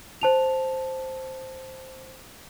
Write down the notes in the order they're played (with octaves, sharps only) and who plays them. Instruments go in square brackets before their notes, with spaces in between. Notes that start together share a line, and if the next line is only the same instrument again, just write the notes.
[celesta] C5 A5 F7